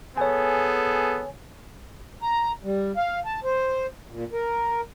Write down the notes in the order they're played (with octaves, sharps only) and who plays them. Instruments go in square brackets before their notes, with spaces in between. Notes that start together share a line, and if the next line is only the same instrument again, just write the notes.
[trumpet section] B3 G#4 A4 [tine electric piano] C#5 G#5
[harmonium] A#5
G3
F5
A5
C5
A#2
A#4